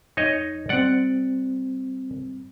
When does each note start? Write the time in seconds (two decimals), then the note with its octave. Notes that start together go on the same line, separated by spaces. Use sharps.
0.17 F2 D#4 C#5 D#5
0.69 G3 C4 D5 F#5